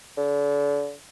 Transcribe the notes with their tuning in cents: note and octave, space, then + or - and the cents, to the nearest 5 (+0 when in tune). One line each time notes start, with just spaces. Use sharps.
D3 -35